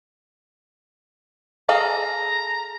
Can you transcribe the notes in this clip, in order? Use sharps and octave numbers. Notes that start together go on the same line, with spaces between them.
G#4 A4 F5 A#5